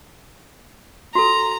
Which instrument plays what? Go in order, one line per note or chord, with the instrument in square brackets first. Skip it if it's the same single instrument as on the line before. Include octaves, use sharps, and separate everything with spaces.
[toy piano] F#4 A4 [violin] A#5